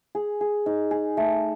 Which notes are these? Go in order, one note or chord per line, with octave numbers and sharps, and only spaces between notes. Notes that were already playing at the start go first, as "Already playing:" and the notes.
G#4
G#4
D#4
G#4
A3